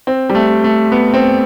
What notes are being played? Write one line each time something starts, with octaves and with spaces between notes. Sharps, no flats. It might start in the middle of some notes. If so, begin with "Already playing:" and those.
C4
G3
A3
A3
B3
C4